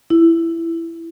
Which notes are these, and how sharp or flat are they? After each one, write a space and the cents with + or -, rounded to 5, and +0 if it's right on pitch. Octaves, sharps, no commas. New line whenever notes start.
E4 +10